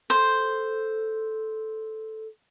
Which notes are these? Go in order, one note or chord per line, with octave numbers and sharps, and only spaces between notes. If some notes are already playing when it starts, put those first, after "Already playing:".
A4 C5